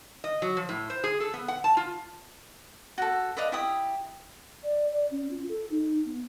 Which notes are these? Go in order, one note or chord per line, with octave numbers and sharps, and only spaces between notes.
D#5
F#3
F3
A2
C5
G#4
A4
B3
F#5
A5
F4
F#4 A4
B4 D5 D#5 F5
E4 G4 D#6
D5
D5
C#4
F4
A4
D#4
B3